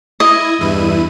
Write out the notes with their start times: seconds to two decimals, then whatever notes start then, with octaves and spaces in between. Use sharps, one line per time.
0.20 E4 D#5 G#6
0.61 E2 G2 E4 D#7